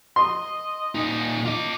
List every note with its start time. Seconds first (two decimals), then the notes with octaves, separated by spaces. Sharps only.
0.16 D#5 C6
0.95 A#2 D#4
1.45 F4 D#5 D6